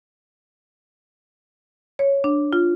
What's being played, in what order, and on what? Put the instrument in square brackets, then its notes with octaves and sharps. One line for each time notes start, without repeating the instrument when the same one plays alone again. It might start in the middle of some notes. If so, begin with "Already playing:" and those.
[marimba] C#5
D4
F4